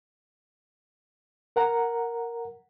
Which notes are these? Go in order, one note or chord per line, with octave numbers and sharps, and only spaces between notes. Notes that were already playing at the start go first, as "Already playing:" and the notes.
A#4 F#5 A#5